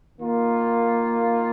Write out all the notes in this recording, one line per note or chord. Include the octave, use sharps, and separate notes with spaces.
D#3 A#3 F4